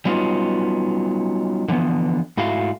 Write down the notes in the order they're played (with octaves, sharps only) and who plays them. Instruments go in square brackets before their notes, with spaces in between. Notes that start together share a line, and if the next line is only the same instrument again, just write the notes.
[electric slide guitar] F#3 G3 B3 C#4 D#4 F4
D3 E3 F3 B3
G#2 A3 E4 F#4 F5